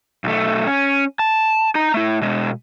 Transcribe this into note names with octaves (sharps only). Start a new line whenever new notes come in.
B1 A3
C#4
A5
D#4 A#5
A3 E4
B2 G#3